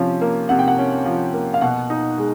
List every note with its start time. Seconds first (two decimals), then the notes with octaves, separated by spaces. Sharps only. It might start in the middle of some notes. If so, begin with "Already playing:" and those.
Already playing: C3 F3 C#4
0.21 A#3
0.49 C3 F#5
0.59 G5
0.68 F#5
0.78 C#4
1.05 F3
1.34 A#3
1.54 F5
1.61 B2 F#5
1.90 D#4
2.18 G#3